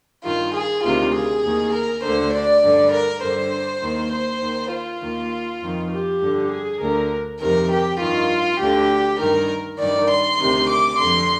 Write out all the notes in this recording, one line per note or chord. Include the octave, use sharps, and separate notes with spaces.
G2 D#3 F4
G#4
D2 C3 D#3 F4
G#4
D#2 D#3
A#4
D2 D3 C5
D5
G2 D3
A#4
G2 D3 C5
D#2 D#3
C5
D#2 D#3
F4
D#2 D#3
F2 D#3
G4
G2 D3
G#4
D2 D3 A#4
F2 C3 D#3 A#4
G4
G2 D#3 F4
D2 D3 G4
G2 D#3 A#4
G2 D#3 D5
C6
D2 C3 D#3
D6
F2 D3 C6